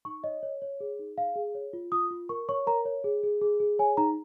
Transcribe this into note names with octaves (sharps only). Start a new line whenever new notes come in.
D#4 C#6
C#5 D#5
C#5
C#5
G#4
D#4
G#4 F5
G#4
C#5
F4
F4 D#6
F4
A#4 C#6
C#5 C#6
A#4 A#5
C#5
G#4
G#4
G#4
G#4
C#5 G#5
D#4 A#5